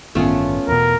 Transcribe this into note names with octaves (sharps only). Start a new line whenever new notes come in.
A1 G2 D#3 A3 B3 C#4 F4
E2 B2 A#4